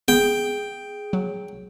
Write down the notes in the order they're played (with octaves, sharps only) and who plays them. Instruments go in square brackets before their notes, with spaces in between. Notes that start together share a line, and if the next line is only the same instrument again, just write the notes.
[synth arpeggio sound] B3 [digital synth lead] G#4 [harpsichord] G5
[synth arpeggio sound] F#3